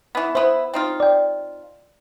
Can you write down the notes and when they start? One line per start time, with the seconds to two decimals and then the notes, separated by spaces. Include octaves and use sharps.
0.15 E3 B3
0.35 B3 E4 C5
0.74 C4 D#4 F4
1.00 D5 G5